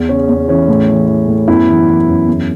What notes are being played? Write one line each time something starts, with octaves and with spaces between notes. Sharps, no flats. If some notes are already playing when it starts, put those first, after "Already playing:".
Already playing: E2
C#3 C#4
E2
E3 C#4
A2
E3
E3
A2
F#2 B3 E4
E3
E3
F#2
E2